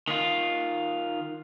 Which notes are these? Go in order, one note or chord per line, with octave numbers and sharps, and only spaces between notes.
D#3 F4